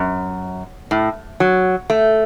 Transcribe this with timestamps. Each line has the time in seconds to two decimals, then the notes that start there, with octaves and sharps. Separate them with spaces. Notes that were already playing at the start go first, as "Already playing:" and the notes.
Already playing: F#2
0.91 A2
1.40 F#3
1.90 A3